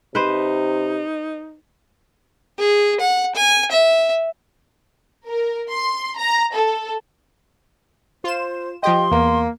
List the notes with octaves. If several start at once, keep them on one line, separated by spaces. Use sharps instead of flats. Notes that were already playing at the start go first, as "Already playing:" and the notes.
C3 D#4 B4 C5
G#4
F#5
G#5
E5
A#4
C6
A#5
A4
F4 C5 C6 E7
F3 G4 D#5 G5 C6
E2 A#3